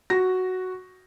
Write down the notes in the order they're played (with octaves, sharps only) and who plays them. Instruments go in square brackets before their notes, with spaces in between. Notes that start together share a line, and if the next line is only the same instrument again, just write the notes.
[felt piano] F#4 A#6